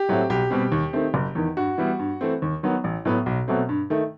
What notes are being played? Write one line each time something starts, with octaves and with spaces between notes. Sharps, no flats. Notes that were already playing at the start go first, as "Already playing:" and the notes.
Already playing: G4
A2 F#3 A3 C4
B1 G4
B2 G3 C4
D#2
D#3 A3 C4
F#1
E2 D#3
G2 F#4
E3 G3 B3
G2
E3 A3 C4
D#2
D#3 F#3 B3
A1
A2 F#3 B3
B1
B2 F#3 A3 C4
G2
D#3 A3